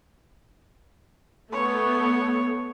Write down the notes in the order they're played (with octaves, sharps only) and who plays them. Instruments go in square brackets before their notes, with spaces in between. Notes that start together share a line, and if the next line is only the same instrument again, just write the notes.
[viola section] A3 B3 [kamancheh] C#5